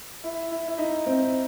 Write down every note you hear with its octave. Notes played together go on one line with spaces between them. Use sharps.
E4
E4
E4
D#4
C4